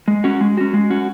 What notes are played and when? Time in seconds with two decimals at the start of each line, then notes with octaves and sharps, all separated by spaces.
0.08 G#3
0.24 C#4 F#4
0.41 G#3
0.57 C#4 F#4
0.74 G#3
0.90 C#4 F#4